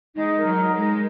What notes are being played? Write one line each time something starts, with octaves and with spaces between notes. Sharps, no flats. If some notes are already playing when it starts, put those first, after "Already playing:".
G#3 D#4
A#4
F#3
D#4
G#3
A#4